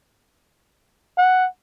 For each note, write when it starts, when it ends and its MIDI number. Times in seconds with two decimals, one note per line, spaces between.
1.18 1.46 78